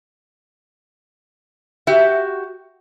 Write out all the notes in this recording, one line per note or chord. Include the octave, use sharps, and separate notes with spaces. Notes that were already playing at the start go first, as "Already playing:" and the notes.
F#4 G4 E5